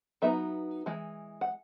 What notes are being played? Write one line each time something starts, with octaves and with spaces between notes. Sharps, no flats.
F#3 B3 D#4 E5
E3 G#3
F#5